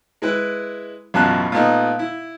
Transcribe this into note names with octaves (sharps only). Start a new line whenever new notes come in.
G#3 E4 B4
A1 F#2 B2 F4 A5 F#6
A#2 A3 B3 D#4
E4